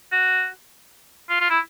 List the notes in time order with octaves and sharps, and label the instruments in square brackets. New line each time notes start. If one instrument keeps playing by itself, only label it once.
[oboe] F#4
F4
F4
E4